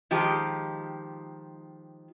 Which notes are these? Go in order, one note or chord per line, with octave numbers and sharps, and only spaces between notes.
D#3 F3 G#3 G4